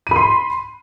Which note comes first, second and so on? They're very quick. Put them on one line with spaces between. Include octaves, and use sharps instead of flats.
D#7 B5 C6